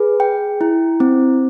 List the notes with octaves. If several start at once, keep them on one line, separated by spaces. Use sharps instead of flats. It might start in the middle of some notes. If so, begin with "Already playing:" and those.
Already playing: G#4 B4
G5
E4
C4